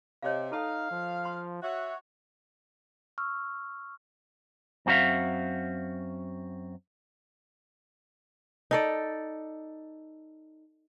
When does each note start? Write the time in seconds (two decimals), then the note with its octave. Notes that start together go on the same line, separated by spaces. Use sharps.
0.22 C3 C#5 D#5 F5
0.52 D#4 A4 F5 A5 D#6
0.91 F3
1.25 C6
1.63 F#4 C#5 E5
3.18 C#6 E6 F6
4.86 F#2 C4 F#4 A4 E5 F5
8.71 D#4 A4 D5